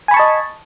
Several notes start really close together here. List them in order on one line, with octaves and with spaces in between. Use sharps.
G#5 B5 C#6 A5 D#5